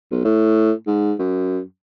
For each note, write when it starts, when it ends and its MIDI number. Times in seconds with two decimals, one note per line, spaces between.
0.12 0.20 35
0.25 0.72 45
0.87 1.14 44
1.19 1.61 42